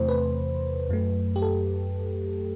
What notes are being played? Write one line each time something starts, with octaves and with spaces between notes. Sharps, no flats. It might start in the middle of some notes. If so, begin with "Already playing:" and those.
Already playing: E2 C3 E3 A3 C5
B4
F#2 F#3 A3
G4
A4